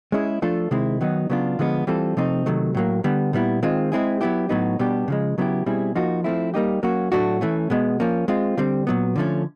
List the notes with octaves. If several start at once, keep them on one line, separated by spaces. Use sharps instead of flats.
G#3 C#4 E4 G#4
F3 A3 D4 F4 A4
C3 D#3 G#3 C4 E4
D#3 F#3 B3 D#4
C#3 F#3 B3 D4 F4
D3 F3 G#3 B3
E3 G3 C4 F4 A4
C3 F3 A3 C4 D#4
C3 D#3 F#3 A3
A2 F#3 A#3
D3 G3 B3
A#2 G3 B3 E4
D#3 G#3 C4 F4
G#3 C4 E4 G#4
F#3 B3 E4 G4
A2 F#3 B3 D#4
B2 G3 B3 D4 G4
C#3 F3 G#3
C#3 F#3 B3 E4 G4
B2 G3 C4 E4 G#4
F3 A#3 D#4 F#4
F3 A3 C4 E4
G3 A#3 D#4 G4
F#3 A#3 C#4 F#4
A2 F#3 A3 D4 F#4
E3 A3 C#4
B2 G#3 B3
F3 A#3 C#4
G#3 C4 F4
D3 G3 C4
A#2 F#3 B3
D3 F3 A3 C#4